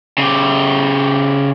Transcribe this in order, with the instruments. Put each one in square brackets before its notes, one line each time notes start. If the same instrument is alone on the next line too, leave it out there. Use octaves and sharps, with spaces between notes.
[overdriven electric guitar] C#3 G4